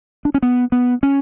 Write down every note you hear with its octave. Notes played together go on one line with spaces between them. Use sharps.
D4
C#4
B3
B3
C#4